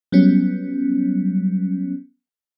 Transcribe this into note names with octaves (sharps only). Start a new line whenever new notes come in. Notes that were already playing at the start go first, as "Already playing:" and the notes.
F#3 G3 B3 C#4